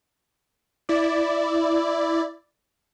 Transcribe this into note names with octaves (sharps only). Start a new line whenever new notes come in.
E4 D5